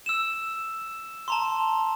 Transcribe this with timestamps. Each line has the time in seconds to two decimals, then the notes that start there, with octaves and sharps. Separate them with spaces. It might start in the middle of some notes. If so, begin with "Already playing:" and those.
0.06 E6 E7
1.28 A5 A#5 C6